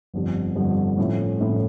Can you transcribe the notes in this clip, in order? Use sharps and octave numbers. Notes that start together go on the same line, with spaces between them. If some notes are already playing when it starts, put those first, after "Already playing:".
G1 F2 D3 G3
G1 F2 D3 G3
A2 F3 A3 C#4 E4
A2 F3 A3 C#4 E4